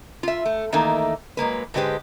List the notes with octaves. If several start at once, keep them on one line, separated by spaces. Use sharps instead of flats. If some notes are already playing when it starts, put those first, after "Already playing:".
F4 E5
A3
D#3 E3 A3 A#3 D#4
F#3 G#3 A#3 B4
G#2 D3 G#3 G4 B4 C5